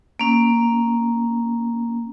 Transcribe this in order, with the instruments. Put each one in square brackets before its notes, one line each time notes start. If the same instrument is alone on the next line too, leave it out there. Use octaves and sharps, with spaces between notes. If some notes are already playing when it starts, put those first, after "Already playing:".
[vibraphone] A#3 C#4